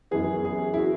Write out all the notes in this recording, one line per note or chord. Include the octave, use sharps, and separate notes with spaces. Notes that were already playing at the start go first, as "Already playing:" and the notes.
F#2 E3 B3 G#4
G#4
E4
F#4